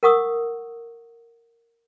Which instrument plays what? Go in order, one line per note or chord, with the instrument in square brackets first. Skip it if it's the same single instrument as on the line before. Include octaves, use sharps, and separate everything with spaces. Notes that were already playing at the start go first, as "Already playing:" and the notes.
[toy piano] A#4 F#5 C#6 D#6 E6